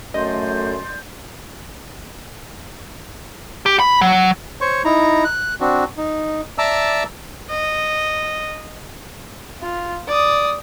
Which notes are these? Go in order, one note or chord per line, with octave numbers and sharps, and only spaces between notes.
F#2 A3 D5 D#5 C6 G6
G4
B5
F#3
C5 C#5 C#6
D#4 E4 A#5
F#6
C4 D4 F#4
D#4
D5 E5 A5 A#5 D6 E6
D#5
F4
D5 D#6